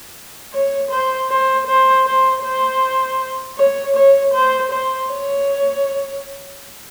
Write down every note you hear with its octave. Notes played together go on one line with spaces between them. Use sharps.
C#5
C5
C5
C5
C5
C5
C#5
C#5
C5
C5
C#5